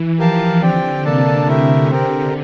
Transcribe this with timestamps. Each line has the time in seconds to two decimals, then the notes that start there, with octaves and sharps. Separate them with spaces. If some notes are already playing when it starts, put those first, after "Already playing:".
Already playing: E3
0.18 F3 G4 A#4 F5 A5
0.61 D3 C4 G4 D5 G5
1.04 C3 A#3 D4 A4 D5 A5
1.47 A3 E4 G4 A#4 E5
1.91 C4 G4 A#4